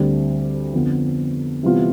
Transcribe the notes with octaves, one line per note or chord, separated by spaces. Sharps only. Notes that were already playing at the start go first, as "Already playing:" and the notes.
Already playing: D2 D3 G3 C4
F2 D3 F3 B3
C3 E3 G3 B3 F4